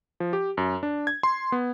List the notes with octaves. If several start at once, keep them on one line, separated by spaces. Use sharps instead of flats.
F3
G4
F#2
D4
G#6
C6
B3